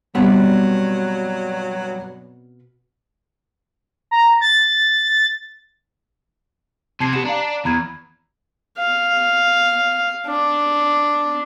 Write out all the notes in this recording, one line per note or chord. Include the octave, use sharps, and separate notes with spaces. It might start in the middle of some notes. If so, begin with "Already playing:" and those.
G2 B2 F#3 G3 B3 C4
A#5
A6
C3 A5 G#6 C7
B3 G4 E7
D4 F5 A#5
E2 A#5 B5 G#6
F5
D4